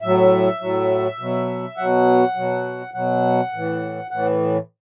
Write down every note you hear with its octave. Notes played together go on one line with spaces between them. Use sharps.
A2 F#3 E5
A2 F#3
B2 F#3
B2 F#3 F#5
B2 F#3
B2 F#3 F#5
A2 E3
A2 E3 F#5